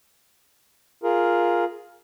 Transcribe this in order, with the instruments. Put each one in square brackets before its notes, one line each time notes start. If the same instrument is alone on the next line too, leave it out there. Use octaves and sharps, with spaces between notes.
[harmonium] F4 G#4 A#4